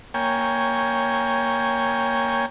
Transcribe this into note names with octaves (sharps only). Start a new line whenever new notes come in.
A#3 C#5 G5 G#5